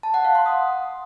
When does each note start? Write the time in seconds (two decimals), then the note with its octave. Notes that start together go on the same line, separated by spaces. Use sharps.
0.03 A5
0.14 F#5
0.25 F5
0.35 C6
0.46 D#6